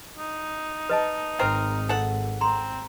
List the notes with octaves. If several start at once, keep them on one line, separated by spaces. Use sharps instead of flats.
D#4
B4 D#5 A5
G#1 D#3 C4 A#4
A4 F#5
C4 A#5 C6